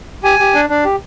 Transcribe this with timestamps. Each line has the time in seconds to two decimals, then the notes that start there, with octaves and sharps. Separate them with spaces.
0.24 G4 G#5
0.39 G4
0.54 D4
0.70 D4
0.85 G4